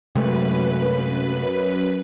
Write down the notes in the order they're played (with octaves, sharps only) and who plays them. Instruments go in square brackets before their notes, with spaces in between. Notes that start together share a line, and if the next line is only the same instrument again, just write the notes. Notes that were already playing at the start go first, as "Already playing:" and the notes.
[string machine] F#2 B4 [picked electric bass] C3 G#3 A3